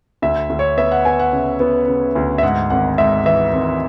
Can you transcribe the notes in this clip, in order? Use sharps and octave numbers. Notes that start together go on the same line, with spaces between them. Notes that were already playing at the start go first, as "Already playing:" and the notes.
D2 E5
D2
C#5
B3 E5
F#5
B3 G#5
F#5
C#3
B3
C#3
D2
E5
G#2 F#5
G#1 F#5
G#2 E5
E3 E5
G#1